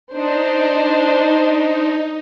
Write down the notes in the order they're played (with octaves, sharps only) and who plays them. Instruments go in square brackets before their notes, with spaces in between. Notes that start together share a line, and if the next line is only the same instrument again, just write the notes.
[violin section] D4 C5 [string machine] D#4